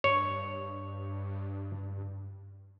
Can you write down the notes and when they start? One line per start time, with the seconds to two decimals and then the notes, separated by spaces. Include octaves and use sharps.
0.04 G2 C#5